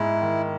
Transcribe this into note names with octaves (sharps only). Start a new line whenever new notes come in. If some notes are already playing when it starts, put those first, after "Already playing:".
Already playing: G#2 G#3 E4
D#3